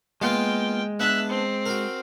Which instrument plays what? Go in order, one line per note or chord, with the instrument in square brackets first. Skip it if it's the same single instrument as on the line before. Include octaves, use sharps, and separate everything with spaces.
[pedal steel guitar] G#3 [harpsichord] A#3 B3 F4 [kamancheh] G5
[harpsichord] B3 D4 [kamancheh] E5 F#6
[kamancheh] C4
[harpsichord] F#4 A#4